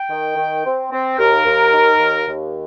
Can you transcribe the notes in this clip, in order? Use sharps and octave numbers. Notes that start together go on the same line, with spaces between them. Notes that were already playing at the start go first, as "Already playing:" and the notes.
Already playing: G5
D#3
D#3
C4
C4
D#2 A#4
D#2
D#3
D#2
D#2